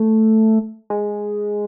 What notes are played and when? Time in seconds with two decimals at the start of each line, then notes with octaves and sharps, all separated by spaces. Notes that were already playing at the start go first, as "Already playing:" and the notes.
Already playing: A3
0.90 G#3